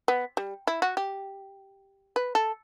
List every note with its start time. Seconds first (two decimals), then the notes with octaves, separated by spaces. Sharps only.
0.08 B3
0.37 G3
0.67 E4
0.82 F#4
0.97 G4
2.16 B4
2.35 A4